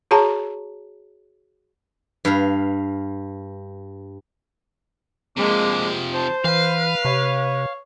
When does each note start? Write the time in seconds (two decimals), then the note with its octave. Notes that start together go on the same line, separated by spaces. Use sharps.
0.11 F#4 G#4 C#5 A5 A#5
2.25 G2 F5
5.37 C3 F3 G#3 A#3 D4
6.13 C5 A5
6.44 E3 B4 F5
7.05 C3 C#5